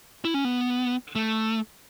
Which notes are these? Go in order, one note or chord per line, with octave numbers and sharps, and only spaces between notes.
E4
C#4
B3
A3